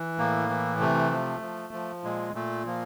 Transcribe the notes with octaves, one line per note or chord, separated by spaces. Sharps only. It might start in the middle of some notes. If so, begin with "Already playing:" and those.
Already playing: E3
A2 A#3
E3
C3 A3
F3
F3
F3
A#2 G#3
A#2 A3
F3 A#3